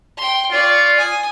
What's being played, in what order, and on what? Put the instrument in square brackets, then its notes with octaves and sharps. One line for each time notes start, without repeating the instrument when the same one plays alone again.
[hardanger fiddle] G5 C6
[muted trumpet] F4 [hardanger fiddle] D5 C#6
[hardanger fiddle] G#5 D#6